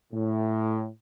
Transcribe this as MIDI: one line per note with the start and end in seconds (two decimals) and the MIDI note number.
0.13 0.87 45